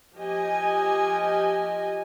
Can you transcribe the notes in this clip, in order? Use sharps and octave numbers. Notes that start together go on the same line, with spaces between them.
F3 G4 D#5 G#5